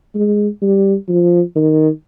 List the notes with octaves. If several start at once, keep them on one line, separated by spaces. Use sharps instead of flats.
G#3
G3
F3
D#3